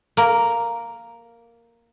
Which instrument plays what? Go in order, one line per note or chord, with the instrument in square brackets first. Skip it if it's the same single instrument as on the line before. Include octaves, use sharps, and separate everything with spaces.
[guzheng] A#3 A#4